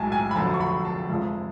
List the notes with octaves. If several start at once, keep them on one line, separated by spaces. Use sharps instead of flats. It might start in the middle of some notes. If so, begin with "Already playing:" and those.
Already playing: B1 A2 G#3 G#5 A5
G#5
B5
F1 F2 D3 F#3 A5
C#6
B5
A5
F1 F2 F3 G#3